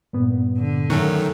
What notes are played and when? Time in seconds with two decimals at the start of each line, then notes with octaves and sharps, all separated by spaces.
0.13 G2 A#2 B3
0.58 D3
0.90 F#2 D#3 A3 F#4